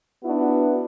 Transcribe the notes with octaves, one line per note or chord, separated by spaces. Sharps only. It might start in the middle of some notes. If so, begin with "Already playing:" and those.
B3 D4 E4 F#4